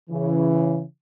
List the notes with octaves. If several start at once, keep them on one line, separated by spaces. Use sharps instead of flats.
C#3 E3